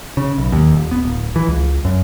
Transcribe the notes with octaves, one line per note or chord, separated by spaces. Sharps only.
C#3
B1
D#2
D#1
B3
D1
E3
C#2
F#2